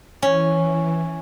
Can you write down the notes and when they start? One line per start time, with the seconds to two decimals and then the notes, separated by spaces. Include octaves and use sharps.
0.22 E3 C#4